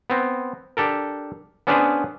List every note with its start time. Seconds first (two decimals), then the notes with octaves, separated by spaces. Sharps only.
0.10 B3 C4
0.77 D4 G4 A4 A#4
1.67 B3 C#4 D4 G#4 B4 C5